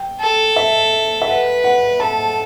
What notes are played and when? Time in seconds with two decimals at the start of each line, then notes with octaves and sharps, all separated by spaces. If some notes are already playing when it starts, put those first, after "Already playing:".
Already playing: G5
0.21 A4
0.56 E5
1.22 E5
1.28 B4 F#5
1.64 F#5
2.00 A4 A5